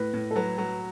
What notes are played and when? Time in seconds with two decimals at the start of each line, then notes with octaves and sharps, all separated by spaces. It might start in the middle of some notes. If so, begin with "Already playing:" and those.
Already playing: A2 B4
0.14 A2
0.31 A4
0.36 F#3 B4
0.58 F#3